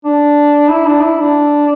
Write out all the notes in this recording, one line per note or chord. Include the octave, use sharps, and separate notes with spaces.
D4
E4
D4
E4
D4